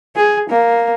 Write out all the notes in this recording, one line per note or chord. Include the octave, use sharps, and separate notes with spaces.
G#4
A#3